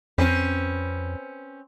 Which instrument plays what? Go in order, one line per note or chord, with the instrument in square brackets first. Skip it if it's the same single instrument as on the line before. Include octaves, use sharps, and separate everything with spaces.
[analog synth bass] F2 [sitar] C4 C#4 B4